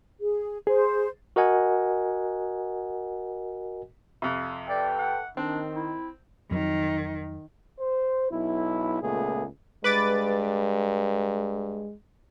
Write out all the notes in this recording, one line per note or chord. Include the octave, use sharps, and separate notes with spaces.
G#4
G#4 C5
F#4 A#4 D#5 F#5 G#5
F2 C3
A4 B4 D5 G5
F#5
D#3 C4 D4
E4
F2 D#3 F#3
C5
B1 E4
C#2 A#2 A3 B3 G#4
G2 G#3 B4 D6 A6